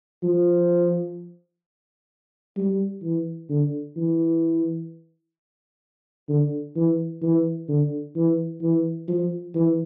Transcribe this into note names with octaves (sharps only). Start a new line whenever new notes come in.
F3
G3
E3
D3
E3
D3
E3
E3
D3
E3
E3
F3
E3